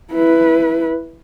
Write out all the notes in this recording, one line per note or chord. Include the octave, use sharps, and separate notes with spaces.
E4 B4